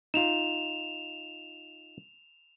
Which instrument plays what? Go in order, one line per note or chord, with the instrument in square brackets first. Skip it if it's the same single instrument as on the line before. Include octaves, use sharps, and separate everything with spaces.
[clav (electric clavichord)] D#4 F4 [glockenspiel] E7 F7